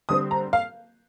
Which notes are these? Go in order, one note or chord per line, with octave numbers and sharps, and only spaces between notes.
D3 G3 C4 D#6
A#5
F5